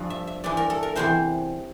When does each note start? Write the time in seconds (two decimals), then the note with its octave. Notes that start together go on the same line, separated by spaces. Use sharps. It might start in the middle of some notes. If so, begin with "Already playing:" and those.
Already playing: G2 F3
0.10 E5
0.27 E5
0.44 G2 E3 D5
0.57 A#4
0.70 A4
0.83 A#4
0.96 E2 C3 E3 C5